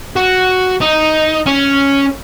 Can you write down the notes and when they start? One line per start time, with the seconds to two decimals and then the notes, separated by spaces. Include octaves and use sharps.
0.16 F#4
0.81 D#4
1.46 C#4